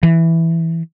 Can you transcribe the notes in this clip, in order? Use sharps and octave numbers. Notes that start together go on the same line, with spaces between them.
E3